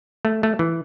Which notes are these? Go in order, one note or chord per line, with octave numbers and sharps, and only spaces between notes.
A3
A3
E3